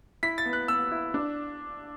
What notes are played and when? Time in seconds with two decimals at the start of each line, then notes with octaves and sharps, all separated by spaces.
0.23 E4 B6
0.38 A6
0.46 B3
0.53 F#6
0.68 B3 E6
0.91 E4
1.14 D4